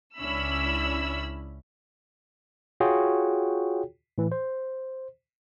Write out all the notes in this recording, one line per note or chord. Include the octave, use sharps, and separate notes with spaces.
C#2 C#4 D4 E4 B5 E6
F4 F#4 G#4 C#5 G5
A2 E3
C5